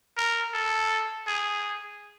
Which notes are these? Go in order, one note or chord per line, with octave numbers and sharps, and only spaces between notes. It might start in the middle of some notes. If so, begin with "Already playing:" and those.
A#4
A4
G#4